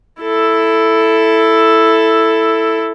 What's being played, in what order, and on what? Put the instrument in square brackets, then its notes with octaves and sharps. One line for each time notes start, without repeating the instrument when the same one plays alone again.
[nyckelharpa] E4 A4